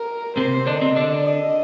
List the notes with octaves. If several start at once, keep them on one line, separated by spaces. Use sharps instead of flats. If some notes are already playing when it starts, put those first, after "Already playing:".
Already playing: A#4
C3 C4 C5
D3 D4 D#5
C3 C4
D3 D4 D5
D#5